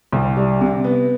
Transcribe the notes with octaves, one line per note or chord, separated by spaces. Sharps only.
C2
G3
C3
B3